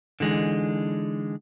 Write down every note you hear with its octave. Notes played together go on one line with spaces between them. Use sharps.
D3 E3 G#3 D#4